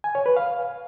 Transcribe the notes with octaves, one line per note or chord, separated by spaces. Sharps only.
G#5
C#5
B4
F5